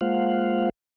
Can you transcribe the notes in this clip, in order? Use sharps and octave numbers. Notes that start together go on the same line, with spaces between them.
G#3 A#3 F4 C5 F5 F#5